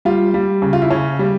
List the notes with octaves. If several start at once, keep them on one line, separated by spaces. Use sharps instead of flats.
G3 F4
G3
C#3
F4
E4
C#3 C#4
G3